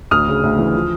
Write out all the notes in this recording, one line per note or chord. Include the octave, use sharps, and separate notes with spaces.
D2 D#6 F6
C#3
D2
E3
F3